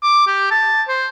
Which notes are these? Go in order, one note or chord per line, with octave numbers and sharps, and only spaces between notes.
D6
G4
A5
C5